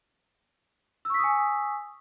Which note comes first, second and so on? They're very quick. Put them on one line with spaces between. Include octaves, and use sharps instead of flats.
E6 C#6 B6 D#6 G#5